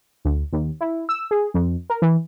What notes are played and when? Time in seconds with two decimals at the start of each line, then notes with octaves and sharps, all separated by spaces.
0.25 D2
0.53 D#2
0.81 E4
1.09 E6
1.31 G#4
1.54 F2
1.90 A#4
2.02 E3